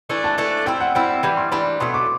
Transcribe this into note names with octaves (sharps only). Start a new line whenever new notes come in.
E3 A3 D4
A5
E3 A3 D4
G3 C4 E4 G5
F#5
G3 C4 E4 G5
E3 G3 D4 B5
C6
E3 G3 D4 B5
B2 F#3 A3 C6
D6